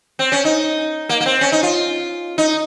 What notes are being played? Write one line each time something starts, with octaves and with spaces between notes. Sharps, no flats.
C4
C#4
D#4
A#3
A#3
C4
C#4
D#4
F4
D#4